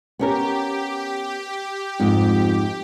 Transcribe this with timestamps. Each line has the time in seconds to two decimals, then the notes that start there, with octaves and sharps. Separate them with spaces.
0.19 B3 C#4 G4 A#4
2.00 F2 G#2